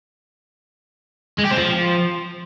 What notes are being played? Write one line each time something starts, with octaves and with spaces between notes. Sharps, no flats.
G#3
G4
C4
F3